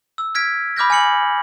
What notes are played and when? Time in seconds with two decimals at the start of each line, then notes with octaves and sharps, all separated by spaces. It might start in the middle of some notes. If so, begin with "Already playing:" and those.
0.18 E6
0.35 F6 G#6 B6 D7
0.77 B5 D6 F6 G6 A#6
0.90 G#5 F6 C#7 F#7